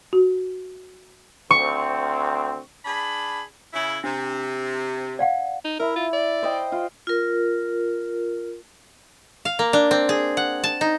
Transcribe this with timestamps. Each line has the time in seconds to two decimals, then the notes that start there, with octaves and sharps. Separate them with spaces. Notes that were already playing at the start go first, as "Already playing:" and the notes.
0.13 F#4
1.51 D2 C4 C#6
2.85 D4 G#4 B5
3.74 C#3 E4
4.04 C3 D4
5.19 D5 F5 F#5
5.65 D#4
5.80 E4 A#4
5.96 F4
6.14 D5
6.42 C5 D#5 G5
6.72 F4
7.07 F4 A#4
9.45 F5
9.59 A#3
9.73 D4
9.91 C4
10.09 G#4
10.37 F#5
10.64 A5
10.81 D#4